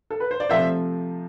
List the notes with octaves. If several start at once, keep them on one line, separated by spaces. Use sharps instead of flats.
A4
B4
C5
D5
C3 F3 A3 C5 E5